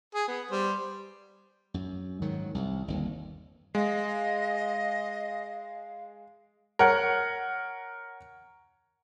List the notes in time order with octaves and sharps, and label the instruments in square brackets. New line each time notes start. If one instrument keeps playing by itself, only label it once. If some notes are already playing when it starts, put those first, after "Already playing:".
[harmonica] G#4
B3
G3 C5
[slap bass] F#2
G#2 D#3 F#3
C2
G1 D#2
[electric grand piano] G#3 [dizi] D#5 [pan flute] F5
[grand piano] A#4 C#5 F#5